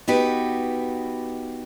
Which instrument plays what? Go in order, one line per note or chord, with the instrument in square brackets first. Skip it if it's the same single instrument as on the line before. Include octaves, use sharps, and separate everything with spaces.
[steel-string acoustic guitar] B3 D#4 F#4 G4 B4